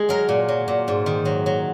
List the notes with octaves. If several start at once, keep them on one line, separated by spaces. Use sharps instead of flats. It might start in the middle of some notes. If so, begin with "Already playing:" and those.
Already playing: G#3 G#4
F#3 A#4
A#2
F#3
A#2
G#2
D#3
F#3
F#3